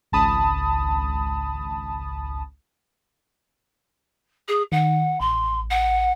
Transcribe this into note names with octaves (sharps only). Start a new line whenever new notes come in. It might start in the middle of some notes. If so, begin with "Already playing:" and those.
G#1 C#2 A5 B5 D#6
G#4
D#3 F#5
A1 C6
F#5